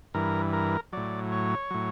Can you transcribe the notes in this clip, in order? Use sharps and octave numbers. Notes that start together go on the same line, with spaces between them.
G2 E3 A#4
A#4
A2 F#3 D5
C#5
A2 F#3